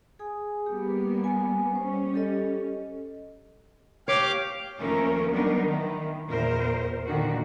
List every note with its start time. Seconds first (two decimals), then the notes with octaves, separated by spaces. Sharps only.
0.19 G#4 G#5 D#6
0.66 G3 A#3 B3 G4
1.24 G#5
1.75 G3 C#4 C5 C#6
2.14 G4 A4 D#5
4.08 G4 C#5 F5 D6
4.79 D#2 F3 A3 C#4 A#4
5.31 F#3 G3 B3 D4 D#4 A#4
5.65 D#3 E3
6.28 E2 A#2 A#4 C5
7.08 A#2 D3 D#3 F#4